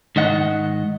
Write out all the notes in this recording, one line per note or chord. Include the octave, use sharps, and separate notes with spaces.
G#2 D#3 D#5 F#5